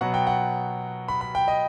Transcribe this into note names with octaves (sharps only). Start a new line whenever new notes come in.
B2 F#3 B3 F#5
G5
F#5
B5
B5
G5
D#5